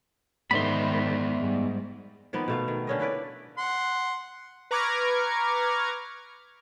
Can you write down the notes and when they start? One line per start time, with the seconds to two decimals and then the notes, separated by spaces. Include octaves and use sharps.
0.51 G#2 D#3 B3 C5 D5 E5 B5 C6
1.39 G#2 G3
2.33 D#3 F3 A#3 B3
2.48 B2 A3 F5
2.68 D#3
2.87 D3 C#4 D#5
3.00 A#3 E4 B4 D5
3.58 F#5 C6
4.71 B4 A#5 C#6 D6 F6 G#6